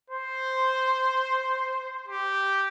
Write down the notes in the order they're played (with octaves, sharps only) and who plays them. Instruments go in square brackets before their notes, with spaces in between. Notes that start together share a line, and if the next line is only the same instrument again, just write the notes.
[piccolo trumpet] C5 [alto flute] C6
[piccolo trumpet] G4